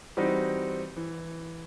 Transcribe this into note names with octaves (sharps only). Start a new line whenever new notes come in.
E3 G3 C4 D#4 F#4
E3